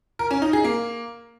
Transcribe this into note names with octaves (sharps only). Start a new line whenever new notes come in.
A#4
C#4
D#4
G#4
A#3